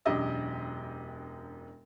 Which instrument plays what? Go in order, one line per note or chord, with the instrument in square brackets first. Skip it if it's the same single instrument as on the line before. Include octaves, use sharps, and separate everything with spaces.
[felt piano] E1 F#2 D4 G4 D#5 E6